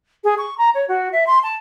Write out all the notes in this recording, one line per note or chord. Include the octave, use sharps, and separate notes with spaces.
G#4
C#6
A#5
C#5
F#4
E5
C6
A5